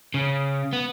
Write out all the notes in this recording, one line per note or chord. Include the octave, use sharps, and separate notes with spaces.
C#3
B3